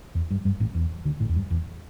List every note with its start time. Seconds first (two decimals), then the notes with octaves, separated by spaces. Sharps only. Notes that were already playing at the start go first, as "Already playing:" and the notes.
0.15 E2
0.31 G2
0.45 G2 G3
0.60 A1 A2
0.75 E2
1.05 D2 D3
1.20 A1 A2
1.29 E2
1.35 G2
1.51 E2